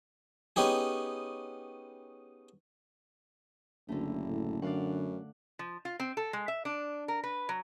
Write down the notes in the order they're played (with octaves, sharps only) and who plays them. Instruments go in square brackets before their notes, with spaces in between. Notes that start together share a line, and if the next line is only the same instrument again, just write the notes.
[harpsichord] B3 C#4 D#4 G4 G#4
[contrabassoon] F#1 [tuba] D2 [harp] D3 A3
[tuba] A2
[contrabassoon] F#2 [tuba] D3 [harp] D5 F5 F#5
[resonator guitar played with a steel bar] F3
F4
C4
A4
G#3
E5
D4
A#4
B4
F#3